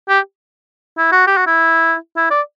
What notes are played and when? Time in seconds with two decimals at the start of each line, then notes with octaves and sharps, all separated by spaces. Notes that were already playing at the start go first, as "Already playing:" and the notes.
0.09 G4
0.98 E4
1.12 F#4
1.27 G4
1.37 F#4
1.46 E4
2.17 E4
2.30 D5